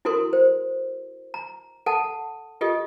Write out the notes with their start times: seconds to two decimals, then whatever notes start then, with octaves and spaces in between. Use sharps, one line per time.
0.05 E4 F#4 A4 A#4 C6
0.33 C5
1.34 A#5
1.86 A4 F#5 A5
2.61 F4 G4 A4 D#5